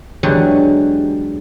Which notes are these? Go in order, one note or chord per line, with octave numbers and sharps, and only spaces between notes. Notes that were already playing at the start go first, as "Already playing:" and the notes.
E2 D3 F#3 G#3 G4 C#5